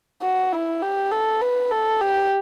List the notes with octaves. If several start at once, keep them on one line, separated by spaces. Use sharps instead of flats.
F#4
E4
G4
A4
B4
A4
G4